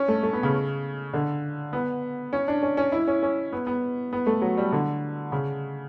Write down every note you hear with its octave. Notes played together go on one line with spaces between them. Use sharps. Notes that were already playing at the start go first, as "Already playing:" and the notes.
Already playing: C#4
A3
A3
B3
C#3
D3
B3
C#4
D4
C#4
C#4
E4
C#4
C#4
B3
B3
B3
A3
F#3
G3
D3
C#3